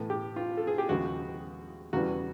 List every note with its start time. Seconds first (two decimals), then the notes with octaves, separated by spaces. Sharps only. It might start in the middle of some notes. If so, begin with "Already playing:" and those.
Already playing: A2 E3 A3
0.10 G4
0.36 F4
0.57 A4
0.67 G#4
0.78 G4
0.89 D#2 C#3 F3 G#3 F#4
1.93 E2 C#3 E3 G3 F#4